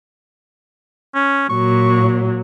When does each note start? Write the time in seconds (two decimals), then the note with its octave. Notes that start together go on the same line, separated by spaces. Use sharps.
1.15 C#4
1.50 A#2 F#3 C#6